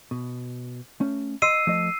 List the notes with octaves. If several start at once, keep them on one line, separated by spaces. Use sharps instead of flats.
B2
A3 C#4
D#5 C6 E6 C7 D#7
F3 A3 D#5